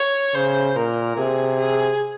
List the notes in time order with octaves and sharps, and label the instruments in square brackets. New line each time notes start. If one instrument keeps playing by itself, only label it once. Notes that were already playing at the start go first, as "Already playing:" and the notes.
Already playing: [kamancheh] C#5
[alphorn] C#3 [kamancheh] C5
[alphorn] A#2 [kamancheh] A#4
[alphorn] C3 [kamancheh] G#4
[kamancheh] G#4